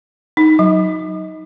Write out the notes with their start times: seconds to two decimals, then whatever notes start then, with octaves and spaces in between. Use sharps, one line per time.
0.37 D#4
0.59 F#3